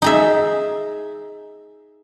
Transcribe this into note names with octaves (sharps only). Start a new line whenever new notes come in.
D#4 G#4 E5